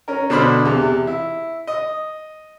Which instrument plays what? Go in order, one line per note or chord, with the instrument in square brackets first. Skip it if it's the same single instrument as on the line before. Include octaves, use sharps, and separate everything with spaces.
[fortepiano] C#4 A#4
B2 D3 D4 C5 B5 F6
E2 C3
E4
D#5